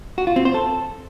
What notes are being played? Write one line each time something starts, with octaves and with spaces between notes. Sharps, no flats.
F#4
F4
C4
C5
A4